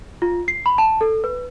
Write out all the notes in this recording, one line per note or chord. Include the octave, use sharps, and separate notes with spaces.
F4
C7
B5
A5
A4
B4